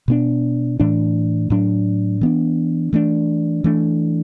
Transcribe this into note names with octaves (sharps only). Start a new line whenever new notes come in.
B2 B3 D4
A2 E3 A3 D4
A2 F#3 D4
E3 B3 D4
E3 A3 D4
E3 A3 D4